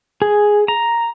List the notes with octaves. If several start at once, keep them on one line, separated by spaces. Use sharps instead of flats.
G#4
A#5